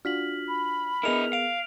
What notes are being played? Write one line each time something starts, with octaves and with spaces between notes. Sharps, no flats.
D4 F4 F#4 F6 B6 F#7
B5
B3 E4 G#4 A#4 D#5 F6 F7
F5 D7 F7